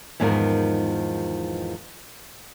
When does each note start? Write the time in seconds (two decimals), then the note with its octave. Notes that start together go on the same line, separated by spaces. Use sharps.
0.20 E2 G#2 D#3 F3 D#4 A#4